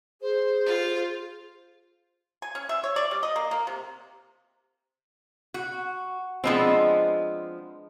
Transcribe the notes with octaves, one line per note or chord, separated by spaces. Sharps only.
G#4 C5
F4
G#5
C#4
E5
C#5
D5
G3
D#5
A#3
A#3
C3
F#4
F3 G#3 B3 C4 D4